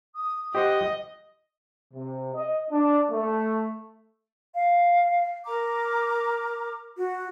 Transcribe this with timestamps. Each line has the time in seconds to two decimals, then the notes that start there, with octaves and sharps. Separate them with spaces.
0.15 D#6
0.55 G4 C5 D#5 F#5
1.94 C3
2.34 D#5
2.71 D4
3.11 A3
4.56 F5
5.46 A#4 A#5 D6
6.96 F#4